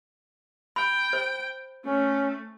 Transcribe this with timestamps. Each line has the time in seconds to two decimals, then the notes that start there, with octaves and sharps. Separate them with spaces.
0.76 G5 B5
1.13 C5
1.84 A3 C#4